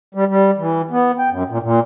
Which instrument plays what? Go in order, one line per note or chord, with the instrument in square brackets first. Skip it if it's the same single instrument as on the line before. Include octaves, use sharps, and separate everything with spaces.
[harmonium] G3
G3
E3
B3
G5
F#2
A#2
A#2